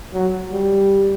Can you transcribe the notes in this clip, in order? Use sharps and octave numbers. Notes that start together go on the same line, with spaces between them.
F#3
G3